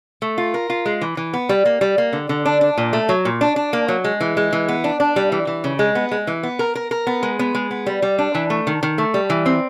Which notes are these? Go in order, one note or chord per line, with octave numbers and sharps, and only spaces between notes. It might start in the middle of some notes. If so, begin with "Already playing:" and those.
A3
F4
A#4
F4
G#3
E3
E3
B3
G3
A#3
G3
A#3
D3
D3
D4
D4
A#2
A3
F#3
A#2
D4
D4
A#3
F#3
G#3
E3
G#3
E3
B3
D4
D4
G3
E3
E3
C#3
G#3
B3
G#3
E3
B3
A#4
A#4
A#4
B3
G#3
B3
G#3
B3
G3
G3
D4
E3
A3
D#3
D#3
A3
G3
E3
C4